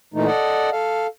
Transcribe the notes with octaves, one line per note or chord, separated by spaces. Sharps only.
A#2 E3 A3 D#4
A4 D5 D#5 F#5
A4 F5